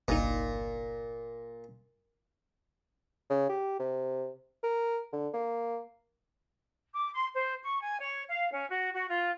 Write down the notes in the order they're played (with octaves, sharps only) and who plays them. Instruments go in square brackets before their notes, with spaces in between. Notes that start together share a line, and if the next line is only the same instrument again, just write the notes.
[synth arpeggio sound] G1 C2 D#4 [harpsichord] A#2
[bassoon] C#3
G4
C3
A#4
D3
A#3
[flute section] D6
C6
C5
C#6
G#5
C#5
F5
C#4
F#4
F#4
F4